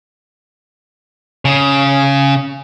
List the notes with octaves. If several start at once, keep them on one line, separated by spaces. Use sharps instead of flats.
C#3